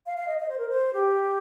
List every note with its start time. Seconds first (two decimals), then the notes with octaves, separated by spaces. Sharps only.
0.06 F5
0.17 F5
0.27 D#5
0.39 D#5
0.48 C5
0.59 A#4
0.69 C5
0.93 G4